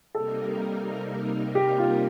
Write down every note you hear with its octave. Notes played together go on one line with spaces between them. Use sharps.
C3 G3 A#3 D#4 A4 A#4
G4
F4